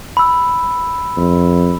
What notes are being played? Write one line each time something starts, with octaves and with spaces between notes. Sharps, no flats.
B5 E6
F2